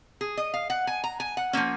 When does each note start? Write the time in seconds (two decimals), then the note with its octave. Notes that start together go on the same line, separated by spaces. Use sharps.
0.21 G#4
0.37 D#5
0.54 F5
0.70 F#5
0.87 G#5
1.04 A#5
1.20 G#5
1.37 F#5
1.53 F3 A#3 C#4